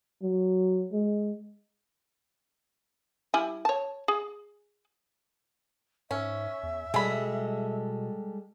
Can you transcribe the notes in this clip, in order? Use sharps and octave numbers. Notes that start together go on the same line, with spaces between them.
F#3
G#3
G3 E4 G#5
C#5 A5
G#4
G#2 C#4 E5
E2
B2 G3 G#3 G#4 A4 B5